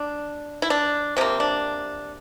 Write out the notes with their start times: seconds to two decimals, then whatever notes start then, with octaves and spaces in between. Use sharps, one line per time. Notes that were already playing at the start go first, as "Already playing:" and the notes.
Already playing: D4
0.62 E4
0.70 D4
1.17 C3 F3 A#3 C4
1.40 D4